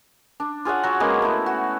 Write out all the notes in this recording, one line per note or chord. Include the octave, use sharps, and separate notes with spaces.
D4
F4 G#4 C#5 F#5
F#3 F#4
G#3 A#3 B3 C#4
A3 E4
F#4